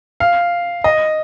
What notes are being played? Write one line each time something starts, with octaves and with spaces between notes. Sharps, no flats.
F5
D#5